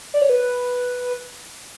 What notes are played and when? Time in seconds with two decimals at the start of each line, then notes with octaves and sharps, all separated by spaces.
0.14 D5
0.22 C#5
0.30 B4